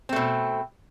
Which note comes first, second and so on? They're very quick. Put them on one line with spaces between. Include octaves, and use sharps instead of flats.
C4 A3 B2